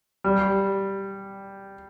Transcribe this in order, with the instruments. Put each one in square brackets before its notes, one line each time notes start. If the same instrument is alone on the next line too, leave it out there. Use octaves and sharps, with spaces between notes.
[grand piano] G3